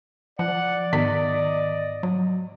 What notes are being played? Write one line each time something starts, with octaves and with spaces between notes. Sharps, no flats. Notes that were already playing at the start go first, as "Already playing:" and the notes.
F3 D5 F#5
G#2 D#3 B3 D#5
F#3